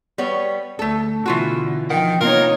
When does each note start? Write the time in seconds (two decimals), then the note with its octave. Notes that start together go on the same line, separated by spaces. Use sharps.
0.18 G3 B3 C#5
0.79 D2 A3 A4
1.26 B2 D3 E3 F4 F#4
1.90 D#3 F3 F#5 G5
2.21 C3 A#3 B3 D#4 F4 A#4 C#5